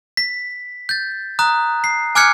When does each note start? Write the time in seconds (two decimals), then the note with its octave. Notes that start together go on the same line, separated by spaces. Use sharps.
0.17 B6
0.89 G6 A6
1.39 A#5 D#6 F#6
1.84 C7
2.15 G#5 D6 F6 F#6 G#6 C#7